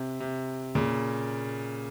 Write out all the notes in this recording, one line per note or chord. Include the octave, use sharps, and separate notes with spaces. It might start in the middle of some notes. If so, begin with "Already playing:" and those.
Already playing: C3
C3
A#2 C#3